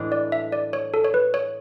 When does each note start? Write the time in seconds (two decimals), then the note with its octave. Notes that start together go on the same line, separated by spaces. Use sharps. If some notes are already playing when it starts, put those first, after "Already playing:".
Already playing: A2 E3 G#3 D4
0.12 D5
0.32 E5
0.52 D5
0.73 C#5
0.94 A4
1.04 C#5
1.14 B4
1.34 C#5